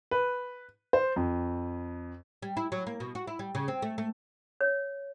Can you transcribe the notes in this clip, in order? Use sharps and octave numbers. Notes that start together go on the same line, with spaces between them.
B4
C5
F2
G3
E4
F#3
A#3
B2
F#4
E4
G3
C#3
C4
A3
A3
C#5